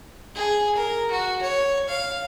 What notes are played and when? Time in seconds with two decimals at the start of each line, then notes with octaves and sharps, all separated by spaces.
0.35 G#4
0.76 A#4
1.11 F#4
1.42 C#5
1.89 F5